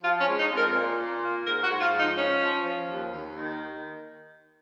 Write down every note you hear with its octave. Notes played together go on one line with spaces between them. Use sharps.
F3 F4
C#4
G#3
D#4
F2
A#4
A#2
A#2
A#3
G#2 A#4
F#4
G#2
F4
F3
D#4
F3 C#4
F3
F3
D#2
D#2
D#3